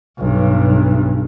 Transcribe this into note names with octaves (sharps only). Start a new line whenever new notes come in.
B1 G2